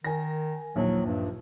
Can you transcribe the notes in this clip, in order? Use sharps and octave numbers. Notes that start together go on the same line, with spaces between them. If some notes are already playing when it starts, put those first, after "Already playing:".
D#3 A#4 G#5 A#6
A#1 D#2 F3 F#3
G2